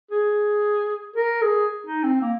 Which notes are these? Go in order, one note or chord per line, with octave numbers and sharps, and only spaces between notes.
G#4
A#4
G#4
D#4
C4
A#3